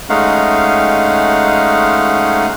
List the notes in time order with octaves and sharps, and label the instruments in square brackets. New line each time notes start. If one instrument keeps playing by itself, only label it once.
[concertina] G#3 A3 C#4 D#4 F5 F#5